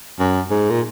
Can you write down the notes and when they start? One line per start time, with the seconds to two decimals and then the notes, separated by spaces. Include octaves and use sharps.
0.19 F#2
0.50 G#2
0.70 A#2